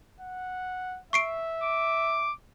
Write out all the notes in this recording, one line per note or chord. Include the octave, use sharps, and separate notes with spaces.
F#5
E5 C#6 C7 D7
D6